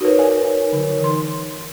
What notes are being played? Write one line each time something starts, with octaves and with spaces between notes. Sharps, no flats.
D#4 F#4 A#4 B4 C#5
D5 F5 G#5
D3 F#3
E3 C6